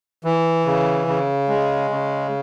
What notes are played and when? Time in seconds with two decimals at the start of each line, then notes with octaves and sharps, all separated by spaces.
0.24 E3
0.66 C#3
1.07 C#3
1.49 G#3
1.90 C#3